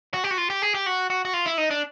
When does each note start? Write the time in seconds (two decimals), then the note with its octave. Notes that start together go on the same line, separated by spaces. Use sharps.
0.14 F#4
0.24 G4
0.31 F#4
0.38 F4
0.50 G4
0.62 G#4
0.74 G4
0.86 F#4
1.10 F#4
1.25 F#4
1.34 F4
1.46 E4
1.58 D#4
1.71 D4